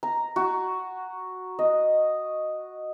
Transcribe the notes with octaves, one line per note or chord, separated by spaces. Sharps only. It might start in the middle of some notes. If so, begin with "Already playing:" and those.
A#5
F#4
D#5